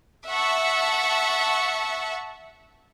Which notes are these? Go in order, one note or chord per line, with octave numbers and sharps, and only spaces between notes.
E5 F#5 A5 C#6